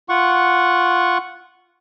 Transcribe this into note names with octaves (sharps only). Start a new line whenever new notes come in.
F4 F#5 C#6